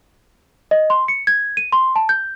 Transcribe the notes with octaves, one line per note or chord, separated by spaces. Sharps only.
D#5
C6
C#7
G#6
D#7
C6
A5
G6